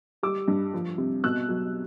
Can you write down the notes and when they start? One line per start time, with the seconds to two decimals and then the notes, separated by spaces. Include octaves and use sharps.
0.23 G3 D6 E6
0.48 G2
0.74 F3
0.98 C3
1.24 B2 E6 F#6
1.49 F#3